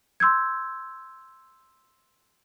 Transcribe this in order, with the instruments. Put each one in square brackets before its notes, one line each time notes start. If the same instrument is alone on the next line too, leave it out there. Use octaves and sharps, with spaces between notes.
[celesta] C6 E6 G6 G#6